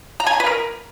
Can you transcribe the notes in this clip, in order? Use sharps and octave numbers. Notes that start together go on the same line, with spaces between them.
A#5
G#5
A#5
B4
A#4